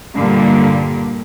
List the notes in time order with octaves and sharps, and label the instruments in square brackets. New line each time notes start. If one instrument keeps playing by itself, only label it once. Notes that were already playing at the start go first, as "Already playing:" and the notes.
[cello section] G2 A#2 D3 G3 A#3